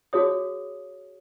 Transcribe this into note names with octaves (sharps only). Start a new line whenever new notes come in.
F#4 G#4 C#5 D#6